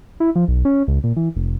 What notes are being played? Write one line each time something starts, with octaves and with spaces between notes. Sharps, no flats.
E4
F3
B1
C#4
C#2
A#2
E3
F1